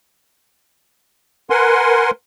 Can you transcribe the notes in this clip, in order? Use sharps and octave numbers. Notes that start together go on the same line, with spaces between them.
A#4 B4 F#5 G#5 C6